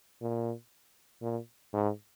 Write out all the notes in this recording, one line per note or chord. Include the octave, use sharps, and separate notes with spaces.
A#2
A#2
G#2